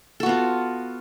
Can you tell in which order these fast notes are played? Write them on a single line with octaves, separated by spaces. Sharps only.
A4 F#4 B3 F4